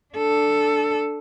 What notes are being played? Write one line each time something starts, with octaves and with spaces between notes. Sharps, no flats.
D4 A4